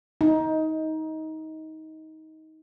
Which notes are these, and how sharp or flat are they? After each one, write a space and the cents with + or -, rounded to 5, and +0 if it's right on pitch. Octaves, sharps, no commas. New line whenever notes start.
D#4 +20